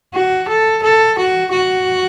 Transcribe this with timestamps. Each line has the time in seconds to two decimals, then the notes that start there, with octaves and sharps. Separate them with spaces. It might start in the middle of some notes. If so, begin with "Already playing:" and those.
0.14 F#4
0.48 A4
0.83 A4
1.18 F#4
1.52 F#4